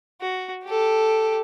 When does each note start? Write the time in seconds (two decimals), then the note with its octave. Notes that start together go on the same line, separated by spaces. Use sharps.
0.21 F#4
0.65 G4 A4